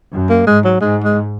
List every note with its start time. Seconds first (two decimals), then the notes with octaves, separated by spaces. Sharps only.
0.12 F#2
0.30 A#3
0.47 G#2 G#3
0.64 F#3
0.81 G#2 G#3
1.04 G#3